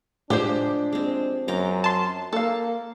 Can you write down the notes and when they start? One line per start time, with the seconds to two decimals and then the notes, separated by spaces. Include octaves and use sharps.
0.30 A2 F3 G#3 D4 G4 G#4 C5
0.93 G#3 C4
1.48 F#2 G5 A#5 D6
1.84 A5 C6
2.33 A#3 A4 F5